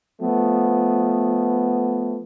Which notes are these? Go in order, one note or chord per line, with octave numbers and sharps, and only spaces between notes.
F3 A3 B3